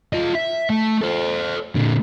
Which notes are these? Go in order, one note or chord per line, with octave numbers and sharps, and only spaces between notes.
F4 D#5
E5
A3
A4 C5
A#2 D3